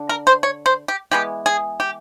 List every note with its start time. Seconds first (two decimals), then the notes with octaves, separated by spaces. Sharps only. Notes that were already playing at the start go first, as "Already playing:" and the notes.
Already playing: D3
0.09 A#4
0.27 C5
0.43 C#5
0.66 C5
0.88 G4
1.11 E3 G#3 B3 G4
1.46 G#4
1.80 G4